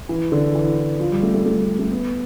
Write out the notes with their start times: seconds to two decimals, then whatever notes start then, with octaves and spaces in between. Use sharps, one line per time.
0.09 E3
0.32 D3
0.55 E3
1.00 F3
1.12 G3
1.23 A3
1.34 A3
1.46 A3
1.57 G3
1.79 A3
1.92 B3